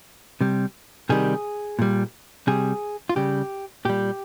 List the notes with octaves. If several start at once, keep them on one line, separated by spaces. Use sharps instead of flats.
C3 G3
C3 D#3 G3 G#4
A#2 G3
C3 G3 G#4
F4
C#3 G3 G4
A#2 G3 G4